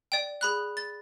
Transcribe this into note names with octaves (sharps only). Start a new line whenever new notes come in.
D5 G5
G#4 B5 F#6
A6